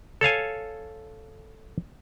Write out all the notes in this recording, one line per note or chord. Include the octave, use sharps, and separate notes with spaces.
A4 C#5 F5 G#5